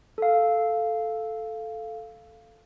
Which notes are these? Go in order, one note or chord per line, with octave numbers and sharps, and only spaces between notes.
A4 F5